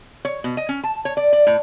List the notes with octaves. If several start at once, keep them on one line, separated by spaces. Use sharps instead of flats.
C#5
B2
D#5
C#4
A5
C#5
D5
D5
A2